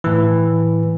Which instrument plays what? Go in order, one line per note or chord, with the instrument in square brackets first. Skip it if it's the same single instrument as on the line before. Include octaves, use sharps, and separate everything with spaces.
[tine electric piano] A2 E3